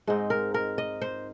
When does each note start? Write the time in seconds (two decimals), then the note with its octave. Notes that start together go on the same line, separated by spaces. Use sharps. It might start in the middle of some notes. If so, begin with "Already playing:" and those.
0.07 G#2 G#3 C4 D#4
0.30 A#4
0.54 A#4
0.78 D#5
1.02 C5